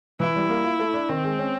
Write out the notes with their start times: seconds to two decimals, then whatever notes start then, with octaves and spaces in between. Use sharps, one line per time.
0.20 E3 E4
0.36 G3
0.49 A#3
0.64 F4
0.79 A3
0.94 D4
1.09 D#3 C4
1.24 G#3
1.39 C#4